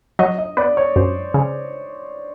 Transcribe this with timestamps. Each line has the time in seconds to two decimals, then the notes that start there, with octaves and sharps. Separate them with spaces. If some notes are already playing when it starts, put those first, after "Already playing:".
0.19 F#3 D#5
0.38 D#5
0.57 B3 D5
0.77 C#5
0.96 F#2 C5
1.34 C#3